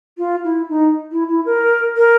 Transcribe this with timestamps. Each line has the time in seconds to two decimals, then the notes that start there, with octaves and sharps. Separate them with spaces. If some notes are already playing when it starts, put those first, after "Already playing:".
0.18 F4
0.44 E4
0.69 D#4
1.12 E4
1.29 E4
1.46 A#4
1.97 A#4